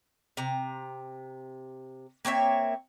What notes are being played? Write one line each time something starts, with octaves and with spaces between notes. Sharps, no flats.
C3 A#5
A#3 C4 C#5 E5